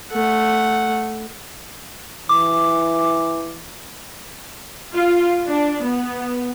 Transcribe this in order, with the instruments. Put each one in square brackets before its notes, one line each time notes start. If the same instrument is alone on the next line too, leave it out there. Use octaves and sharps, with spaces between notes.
[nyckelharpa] A3 F#5
[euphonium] E3 [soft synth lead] D6
[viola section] F4
D4
B3